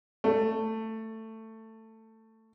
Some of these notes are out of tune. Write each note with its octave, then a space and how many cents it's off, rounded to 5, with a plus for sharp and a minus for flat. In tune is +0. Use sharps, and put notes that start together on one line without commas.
A3 +15